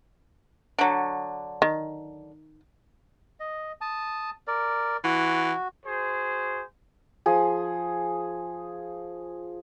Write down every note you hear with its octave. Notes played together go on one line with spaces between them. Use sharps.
D3 F#3
D#3
D#5
A5 D#6
A#4 D5
E3 F#4
F#4 G#4 C5
F3 G#4